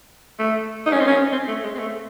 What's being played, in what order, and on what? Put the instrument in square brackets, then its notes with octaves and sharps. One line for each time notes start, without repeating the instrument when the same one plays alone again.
[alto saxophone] A3
D#4
C#4
C4
C#4
C4
A3
G#3
C4
A3